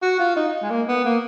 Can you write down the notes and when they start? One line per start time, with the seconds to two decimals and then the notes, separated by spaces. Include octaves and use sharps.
0.02 F#4
0.19 F4
0.36 D#4
0.62 G#3
0.70 A#3
0.88 B3
1.05 A#3